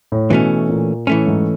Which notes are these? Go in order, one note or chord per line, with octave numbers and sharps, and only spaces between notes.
A2
B2 E3 A3 C#4
A#2
A2 E3 A3 C#4
G#2